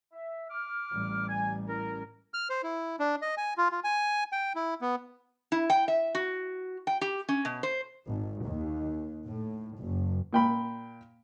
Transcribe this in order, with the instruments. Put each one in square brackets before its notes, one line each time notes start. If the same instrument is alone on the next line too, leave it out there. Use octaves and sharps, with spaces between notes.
[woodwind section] E5
D6 F6
[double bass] A1 G3
[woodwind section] G#5
C#4 E4 A#4
[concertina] F6
C5
E4
D4
D#5
G#5
F4
F4
G#5
G5
E4
B3
[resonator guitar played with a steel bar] E4
G5
E5
F#4
G5
G4
C#4
B2
C5
[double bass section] G#1
D#2
A2
F#1
[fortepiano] A#2 G5 B5